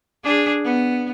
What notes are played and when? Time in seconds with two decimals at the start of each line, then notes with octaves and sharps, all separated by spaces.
0.24 D4 G#4
0.64 B3